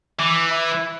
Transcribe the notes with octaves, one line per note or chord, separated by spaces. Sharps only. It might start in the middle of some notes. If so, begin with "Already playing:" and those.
E3 D6
E4